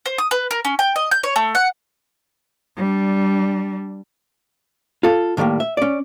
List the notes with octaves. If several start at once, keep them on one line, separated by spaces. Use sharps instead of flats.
C5
D#6
B4
A#4
C#4
G5
D#5
G6
C#5
A3
F#5
G3 D4
F4 A4
A2 D#3 G3 A3 A#3
E5
C#4 D5